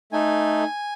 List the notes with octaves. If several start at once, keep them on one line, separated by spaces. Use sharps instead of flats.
A3 D#4 A4 G#5